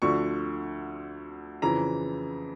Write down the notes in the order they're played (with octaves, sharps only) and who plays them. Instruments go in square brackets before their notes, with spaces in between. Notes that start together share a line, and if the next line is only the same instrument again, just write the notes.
[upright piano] D2 D3 F3 C#6
F2 C#3 E3 A#5